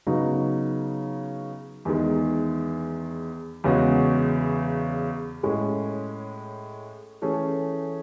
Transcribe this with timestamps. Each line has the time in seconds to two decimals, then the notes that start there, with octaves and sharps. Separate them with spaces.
0.07 C#3 F#3 B3 D#4 F#4
1.85 E2 D#3 G#3
3.64 E2 C#3 G#3 C#4 F#4
5.43 A2 G#3 C#4
7.22 E3 A3 C#4 G#4